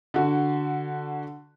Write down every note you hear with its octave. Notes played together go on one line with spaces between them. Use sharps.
D3 F#4